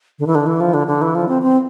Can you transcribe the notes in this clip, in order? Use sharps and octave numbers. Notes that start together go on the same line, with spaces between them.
D3
E3
D3
E3
F3
D3
D3
E3
F3
C4
C4